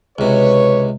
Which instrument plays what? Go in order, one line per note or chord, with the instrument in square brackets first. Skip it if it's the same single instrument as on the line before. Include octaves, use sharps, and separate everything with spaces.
[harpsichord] C#2 C3 [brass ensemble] B4 C#5